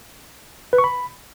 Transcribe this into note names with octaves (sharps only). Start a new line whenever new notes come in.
B4
C#6
B5